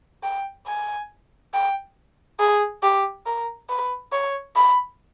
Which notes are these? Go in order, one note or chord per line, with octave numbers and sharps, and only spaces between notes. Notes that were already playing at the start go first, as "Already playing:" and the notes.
G5
G#5
G5
G#4
G4
A#4
B4
C#5
B5